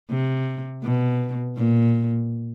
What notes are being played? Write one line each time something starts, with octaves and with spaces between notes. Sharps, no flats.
C3
B2
A#2